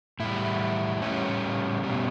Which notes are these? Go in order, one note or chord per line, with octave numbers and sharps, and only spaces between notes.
A2 G3 E4
A2 G3 C#4
B2 G3